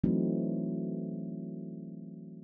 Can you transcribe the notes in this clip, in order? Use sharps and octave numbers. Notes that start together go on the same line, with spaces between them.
E3 F#3 A3 C4 D4 D#4